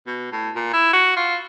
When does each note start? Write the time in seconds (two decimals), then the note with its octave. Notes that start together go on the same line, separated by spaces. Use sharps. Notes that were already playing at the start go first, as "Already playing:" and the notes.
0.07 B2
0.32 A2
0.55 A#2
0.73 E4
0.93 F#4
1.16 F4